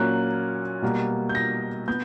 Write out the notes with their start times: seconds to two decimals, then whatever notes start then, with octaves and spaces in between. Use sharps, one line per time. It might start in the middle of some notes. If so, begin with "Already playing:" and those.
Already playing: A#2 F#3 A#3 C#4 F#6
0.82 B2 G3 A#3
1.29 G6
1.35 A#6
1.88 B3 G6